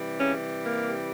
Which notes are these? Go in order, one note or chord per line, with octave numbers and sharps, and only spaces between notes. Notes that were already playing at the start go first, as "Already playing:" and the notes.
Already playing: C3 E3 G3
C#3 C#4
A#3